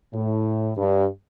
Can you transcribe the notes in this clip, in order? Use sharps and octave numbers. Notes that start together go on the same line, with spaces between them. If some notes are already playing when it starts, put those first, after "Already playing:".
A2
G2